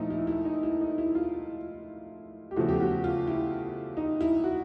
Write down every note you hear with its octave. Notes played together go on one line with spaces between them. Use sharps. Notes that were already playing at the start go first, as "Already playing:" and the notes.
Already playing: A#2 F3 A3 D#4 E4
E4
E4
D#4
E4
D#4
E4
F4
G4
E2 C#3 F3 A3 F#4
G4
F#4
F4
E4
D#4
E4
F#4